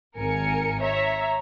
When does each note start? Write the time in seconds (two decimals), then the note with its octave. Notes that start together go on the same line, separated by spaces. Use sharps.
0.16 G#1 A#4 G#5 C#7
0.81 C#5 E5 A#5